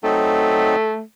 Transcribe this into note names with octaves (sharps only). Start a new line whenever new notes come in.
F#3 A3 C4 D#4